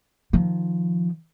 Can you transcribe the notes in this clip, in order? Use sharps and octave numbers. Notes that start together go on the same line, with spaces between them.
D#3 F3